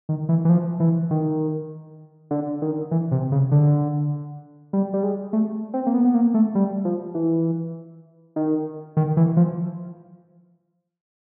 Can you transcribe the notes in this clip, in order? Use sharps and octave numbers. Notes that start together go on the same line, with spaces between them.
D#3
E3
E3
F3
E3
D#3
D3
D#3
E3
C3
C#3
D3
G3
G3
G#3
A3
C4
A#3
B3
B3
A#3
A3
G3
F3
E3
D#3
D#3
E3
F3